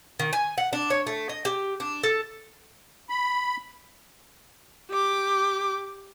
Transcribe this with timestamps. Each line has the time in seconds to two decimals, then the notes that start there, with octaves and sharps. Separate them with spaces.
0.20 D#3
0.33 G#5
0.58 F#5
0.73 D4
0.90 C#5
1.07 A3
1.29 D#5
1.45 G4
1.80 D4
2.03 A4
3.10 B5
4.91 G4 D6